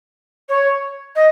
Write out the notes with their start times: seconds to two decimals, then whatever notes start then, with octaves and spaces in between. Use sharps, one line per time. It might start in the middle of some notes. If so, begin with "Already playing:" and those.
0.49 C#5
1.15 D#5